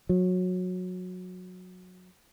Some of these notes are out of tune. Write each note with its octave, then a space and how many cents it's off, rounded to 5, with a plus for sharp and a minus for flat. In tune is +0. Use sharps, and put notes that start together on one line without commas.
F#3 -20